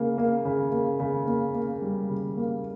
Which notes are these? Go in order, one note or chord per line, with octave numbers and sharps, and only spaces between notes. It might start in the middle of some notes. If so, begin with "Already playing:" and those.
Already playing: C#3 A#3
A#3
C#3
A#3
C#3
A#3
A#3
G3
C#3
A#3